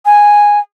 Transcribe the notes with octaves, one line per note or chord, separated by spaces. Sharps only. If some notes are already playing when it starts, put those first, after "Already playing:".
G#5